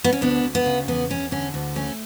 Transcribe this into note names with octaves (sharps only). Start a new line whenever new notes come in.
B3
C#4
D2 B3 D4
D2
B3
C#3
E2 B3
E2 C#4
D3 C#4
D2
A3 C#4